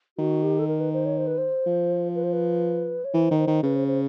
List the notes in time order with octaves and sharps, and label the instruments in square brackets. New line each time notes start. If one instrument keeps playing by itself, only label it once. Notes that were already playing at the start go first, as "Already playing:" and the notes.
[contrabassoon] D#3 [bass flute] F#4
[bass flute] G4
A4
A#4
B4
C5
C#5
C5
B4
C5
[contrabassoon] F3
[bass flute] B4
C5
B4
C#5
[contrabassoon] E3 [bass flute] C5
[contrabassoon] D#3
[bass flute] C5
[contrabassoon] D#3
[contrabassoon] C#3 [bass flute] B4
[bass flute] C5
C5